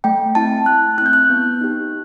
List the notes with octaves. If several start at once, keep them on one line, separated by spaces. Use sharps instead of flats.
A3 G5
C4 E4 A5
A3 F#6
C4 E4 F#6 G6
F#6
B3
D#4 G4